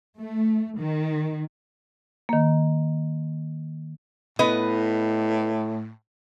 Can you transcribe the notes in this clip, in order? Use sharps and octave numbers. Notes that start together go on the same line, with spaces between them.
A3
D#3
D#3 A#3
A2 B3 B4 D#5